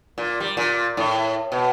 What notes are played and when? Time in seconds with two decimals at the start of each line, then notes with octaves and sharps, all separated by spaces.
0.18 A#2
0.40 G3
0.57 A#2
0.97 A2
1.52 B2